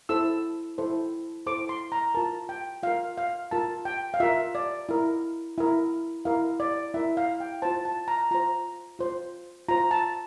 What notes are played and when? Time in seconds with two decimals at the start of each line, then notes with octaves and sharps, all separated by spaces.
0.09 E4 A4 C5 E6
0.78 E4 A4 C5
1.47 E4 A4 C5 D6
1.69 C6
1.92 A#5
2.15 F4 A#4 A5
2.49 G5
2.83 F4 A#4 F5
3.18 F5
3.51 F4 A#4 A5
3.85 G5
4.14 F5
4.20 F4 A#4 E5
4.55 D5
4.89 E4 A#4
5.58 E4 A#4
6.25 E4 A#4 F5
6.60 D5
6.94 E4 A#4 E5
7.17 F5
7.40 G5
7.62 F4 C5 A5
7.85 A5
8.08 A#5
8.31 F4 C5 A#5
8.99 F4 C5
9.69 F4 C5 A#5
9.91 A5